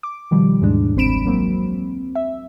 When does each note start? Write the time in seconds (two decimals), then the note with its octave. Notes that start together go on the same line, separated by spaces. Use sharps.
0.03 D6
0.31 B2 D#3 F3 G3
0.61 D#2 G#2 E3 G#3 D4
0.96 G1 C2 C4 B5 D7 E7
1.26 F#3 A#3 C4
2.15 E5